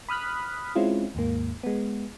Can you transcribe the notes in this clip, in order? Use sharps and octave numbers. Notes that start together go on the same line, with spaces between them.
B5 D#6 F6 F#6 B6
G#3 C4 C#4 E4 F4
D#2 G#2 A#3
G#3 B3